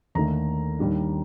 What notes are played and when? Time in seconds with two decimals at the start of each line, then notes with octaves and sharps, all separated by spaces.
0.15 D#2 D3 A3 D#4 A#5
0.79 D#2 D#3 G3 D4